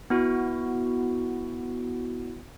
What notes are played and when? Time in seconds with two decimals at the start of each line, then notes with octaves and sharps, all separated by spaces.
0.10 B3 E4 F#4